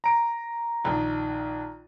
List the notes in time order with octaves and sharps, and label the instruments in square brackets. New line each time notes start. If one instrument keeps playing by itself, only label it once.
[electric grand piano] A#5 D7
[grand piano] A#1 D#3